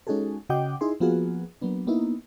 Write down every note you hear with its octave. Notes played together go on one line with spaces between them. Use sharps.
G#3 C#4 D#4 F#4 G#4 A4
C#3 F#4 D#5 F#5 G5 D6
D#4 E4 G#4 C6
F3 A#3 B3 F4 F#4 G#4
F#3 A#3 B3 D4
A#3 B3 D#4 E4